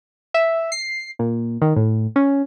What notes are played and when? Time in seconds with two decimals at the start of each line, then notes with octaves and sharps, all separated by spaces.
0.34 E5
0.72 C7
1.19 A#2
1.62 D#3
1.76 A2
2.16 C#4